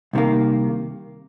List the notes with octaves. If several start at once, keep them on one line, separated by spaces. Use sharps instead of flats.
C2 C3 D#3 A#3